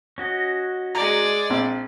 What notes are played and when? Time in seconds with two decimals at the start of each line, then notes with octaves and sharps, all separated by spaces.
0.18 C#4 F#4 D#5
0.95 G#3 D5 A#5
1.50 A#1 C4